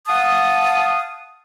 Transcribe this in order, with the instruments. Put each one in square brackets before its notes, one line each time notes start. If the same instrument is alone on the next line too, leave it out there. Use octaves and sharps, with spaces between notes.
[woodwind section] F5 F#5 A5 D#6